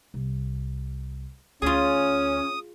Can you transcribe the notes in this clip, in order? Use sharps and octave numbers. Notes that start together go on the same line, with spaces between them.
C2
D2 C#4 F4 G#4 D#6